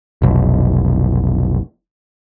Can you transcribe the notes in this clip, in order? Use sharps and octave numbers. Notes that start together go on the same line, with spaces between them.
F1 B1